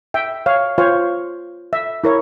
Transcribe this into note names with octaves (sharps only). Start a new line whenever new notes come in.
E5 G5
C#5 F5
F4 C5 C#5 F5
E5
E4 A#4 C#5